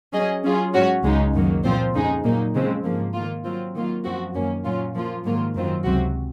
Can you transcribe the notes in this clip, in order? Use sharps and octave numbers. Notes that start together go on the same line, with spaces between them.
F#3 C#4 G#4 D#5
F#3 C#4 F4 G#4
G#2 F#3 C#4 F#4 C#5
C#2 C#3 G#3 D#4
F#2 D#3 F#3 A#3
A#2 F3 C4 F4 C5
F2 C#3 G#3 D#4 G#4
A#2 F#3 A#3 D#4
C#3 F3 G#3 C4
G#2 F3 A#3
D#3 A#3 F4
F#3 C4 F4
D#3 F#3 A#3 F4
F#2 F3 C4 F#4
F#2 D#3 A#3 C#4
A#2 F#3 C#4 F4
F3 A#3 F4
G#2 D#3 F#3 A#3 F4
F#2 D#3 F#3 C4 F4
C#2 C3 F#3 C4 F#4